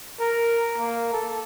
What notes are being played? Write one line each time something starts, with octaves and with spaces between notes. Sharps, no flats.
A#4
A#3
A4